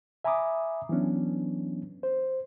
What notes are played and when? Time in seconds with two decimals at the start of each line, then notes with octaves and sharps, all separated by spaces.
0.24 E5 G#5 A#5 B5 D6 D#6
0.89 E3 F#3 B3 C#4 D4
2.03 C5